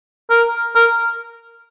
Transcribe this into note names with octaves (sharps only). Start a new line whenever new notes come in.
A#4
A#4